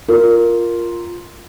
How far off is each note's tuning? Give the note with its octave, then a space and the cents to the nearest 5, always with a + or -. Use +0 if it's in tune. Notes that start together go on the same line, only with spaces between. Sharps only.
F4 +0 A#4 +0